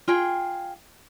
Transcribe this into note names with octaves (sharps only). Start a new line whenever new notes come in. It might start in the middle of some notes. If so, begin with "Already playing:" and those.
F4 G#4 G5